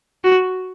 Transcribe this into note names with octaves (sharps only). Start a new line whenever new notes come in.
F#4